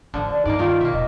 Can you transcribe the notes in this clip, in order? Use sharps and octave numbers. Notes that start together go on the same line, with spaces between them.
A1 D3 F3
D#4 D5
G2 A#3 D#4 D5
D#3 F4 A#4
B2 A#3 E5
D#1 A#2 D#5